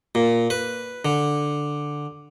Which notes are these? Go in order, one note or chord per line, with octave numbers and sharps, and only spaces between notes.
A#2
B4
D3